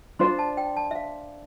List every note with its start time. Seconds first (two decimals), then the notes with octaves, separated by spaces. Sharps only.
0.19 D4 F4 C5 C6
0.39 A5
0.57 G5
0.77 A5
0.91 E5
0.96 F5